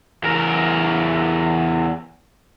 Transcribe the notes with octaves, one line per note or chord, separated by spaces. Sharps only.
E2 A#4